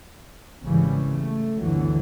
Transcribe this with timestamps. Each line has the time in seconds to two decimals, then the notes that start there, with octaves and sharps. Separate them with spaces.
0.64 G#1 C#3 E3 G3
1.10 A3
1.60 G1 D2 D3 E3 F#3